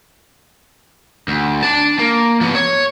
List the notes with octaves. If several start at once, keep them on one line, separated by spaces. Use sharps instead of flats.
D2
D4 A5
A#3
F3 B3
C#5